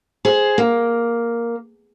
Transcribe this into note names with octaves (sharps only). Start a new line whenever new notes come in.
G#4 C5
A#3